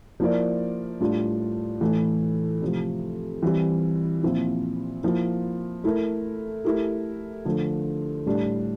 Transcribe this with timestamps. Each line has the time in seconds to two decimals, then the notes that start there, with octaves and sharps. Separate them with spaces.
0.20 F3 A#3 E4 A#4 D5
1.00 A2 G3 D4 F4
1.81 A2 E3 A3
2.62 C3 F3 A3
3.43 E3 G3 C4
4.23 A#2 F3 C4 E4
5.03 F3 A#3 E4
5.84 A3 E4 A#4
6.65 A3 E4 G4 A#4
7.45 D3 F3 A3
8.26 A2 G3 D4